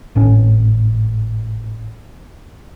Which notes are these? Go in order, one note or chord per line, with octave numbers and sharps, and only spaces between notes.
G#1 A2 C#4